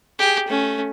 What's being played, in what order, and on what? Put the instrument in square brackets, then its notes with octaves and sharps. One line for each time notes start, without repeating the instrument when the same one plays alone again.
[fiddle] G4 G#4
A3 C#4